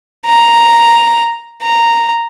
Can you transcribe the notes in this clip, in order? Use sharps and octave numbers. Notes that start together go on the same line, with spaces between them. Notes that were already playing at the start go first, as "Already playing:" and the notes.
A#5
A#5